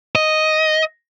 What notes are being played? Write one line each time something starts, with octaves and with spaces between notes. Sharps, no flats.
D#5